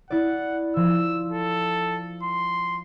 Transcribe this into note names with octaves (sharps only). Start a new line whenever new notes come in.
E4 D5 F#5
F3 E6
A4
C6